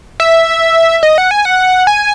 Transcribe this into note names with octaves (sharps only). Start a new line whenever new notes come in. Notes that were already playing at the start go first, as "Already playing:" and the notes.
E5
D#5
F#5
G#5
F#5
G#5